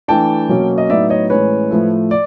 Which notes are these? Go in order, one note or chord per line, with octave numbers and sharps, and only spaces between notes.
E3 A3 D4 G5 A5
B2 F#3 A#3 C#4
D#5
A2 F#3 B3 D#4 D5 E5
C#5 D#5
A2 E3 G#3 C#4 B4 C#5
A2 F3 A3
D5